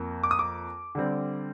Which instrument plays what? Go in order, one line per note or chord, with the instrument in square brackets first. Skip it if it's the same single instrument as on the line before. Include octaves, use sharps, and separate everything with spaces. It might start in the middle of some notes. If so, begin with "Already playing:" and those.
Already playing: [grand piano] F2 A#3
D6
D#6
D6
D3 G3 C4